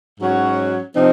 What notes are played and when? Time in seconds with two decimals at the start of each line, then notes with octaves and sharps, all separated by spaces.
0.21 G#2 F#3 C#4 F#4 C#5
0.96 C3 F3 C4 D#4